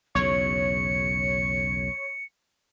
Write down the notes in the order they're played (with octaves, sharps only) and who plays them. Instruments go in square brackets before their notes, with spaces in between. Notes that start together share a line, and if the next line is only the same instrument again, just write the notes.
[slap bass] B1 E2 C#3 [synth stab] C#5 [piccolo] C#7